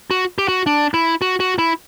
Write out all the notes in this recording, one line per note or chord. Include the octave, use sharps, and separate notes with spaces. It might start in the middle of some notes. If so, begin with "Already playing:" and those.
F#4
G4
F#4
D4
E4
F#4
F#4
E4